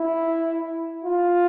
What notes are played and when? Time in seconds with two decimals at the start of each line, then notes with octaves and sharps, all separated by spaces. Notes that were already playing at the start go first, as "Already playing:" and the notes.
Already playing: E4
1.05 F4